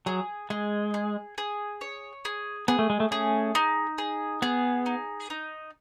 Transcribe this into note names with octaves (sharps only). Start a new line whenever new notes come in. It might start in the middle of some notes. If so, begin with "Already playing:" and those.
F#3 G#4
G#3 G#4
G#4
G#4
C#5
G#4
B3 G#4
A3
G#3
A3
A3 C#4 G#4
D#4
G#4
B3 G#4
D#4
D#4